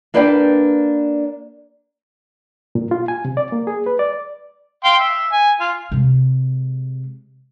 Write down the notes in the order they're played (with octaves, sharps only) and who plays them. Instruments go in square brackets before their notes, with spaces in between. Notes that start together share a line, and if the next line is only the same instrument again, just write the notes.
[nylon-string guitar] A#3 D4 B4 D5 F5 G5
[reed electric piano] A#2
F4
G#5
C3
D5
A#3
G#4
B4
D5
[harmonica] F5 G5 C6
E5
G#5
F4
[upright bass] C3 G#3